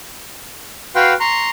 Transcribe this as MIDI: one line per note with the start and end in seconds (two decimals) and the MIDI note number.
0.95 1.13 66
0.95 1.13 71
0.95 1.13 77
0.95 1.13 79
0.95 1.13 84
1.20 1.50 82
1.20 1.50 84
1.20 1.50 85